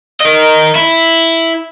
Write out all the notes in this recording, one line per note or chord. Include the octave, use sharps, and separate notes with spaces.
A#4 D#5
E4